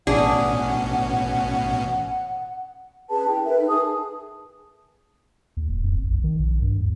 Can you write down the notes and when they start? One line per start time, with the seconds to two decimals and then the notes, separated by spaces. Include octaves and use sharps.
0.07 A1 B2 C#4 D4 G#4 F#5
3.10 C#4 G#4 B4 A5
3.26 E4 G5
3.44 A#4 B4 E5
3.57 D#4 A4
3.69 G#4 G#5 A5 D#6
5.57 D#2
5.69 D#1
5.84 F2
5.96 F#1
6.08 A#1
6.24 D#3
6.39 A#1
6.62 G2
6.79 D#2